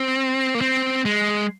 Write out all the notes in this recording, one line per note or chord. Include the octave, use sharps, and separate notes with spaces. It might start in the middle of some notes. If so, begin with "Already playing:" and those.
Already playing: C4
A#3
C4
G#3